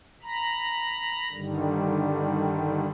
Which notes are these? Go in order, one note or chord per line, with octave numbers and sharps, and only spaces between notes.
A#5 B5
G2 D3 D#3 G3